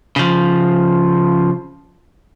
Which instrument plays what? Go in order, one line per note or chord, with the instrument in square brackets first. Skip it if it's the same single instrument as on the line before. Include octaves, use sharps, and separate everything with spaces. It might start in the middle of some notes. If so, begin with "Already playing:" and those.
[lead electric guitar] C#3 F3